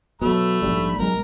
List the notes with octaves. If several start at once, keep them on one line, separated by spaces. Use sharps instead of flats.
B2 F#3 A3 B5
A#1 G#2 G3
B1 F3 G#3 A#4